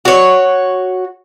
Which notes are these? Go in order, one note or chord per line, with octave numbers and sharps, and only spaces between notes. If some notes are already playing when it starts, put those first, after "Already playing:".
F#4 C#5